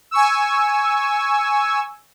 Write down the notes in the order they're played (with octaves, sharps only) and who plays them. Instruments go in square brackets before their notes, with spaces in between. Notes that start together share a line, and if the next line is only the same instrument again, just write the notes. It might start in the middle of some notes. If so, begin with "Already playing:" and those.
[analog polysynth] G#5 C#6 E6